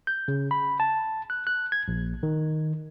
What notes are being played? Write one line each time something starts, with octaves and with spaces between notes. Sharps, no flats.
G6
C#3
B5
A5
F#6
F#6
G#6
A#1
D#3